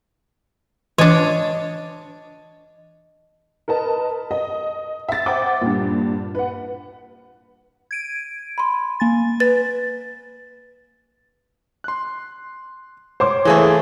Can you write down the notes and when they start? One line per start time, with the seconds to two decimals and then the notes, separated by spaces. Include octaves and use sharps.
0.98 E3 D4 C#5 D#5 A5
3.68 A#4 B4 D#5 A5
4.31 D#5
5.08 E5 A6
5.26 C5 F#5 G5 D6
5.61 G2 A#2
6.35 B4 F#5
7.91 G#6 D7 D#7
8.58 B5 C6
9.00 A#3 G#5 A6
9.40 B4 A6
11.84 C6 F#6
13.20 C5 C#5 C6 D6
13.45 E3 A3 A#3 G#4 C5 G#5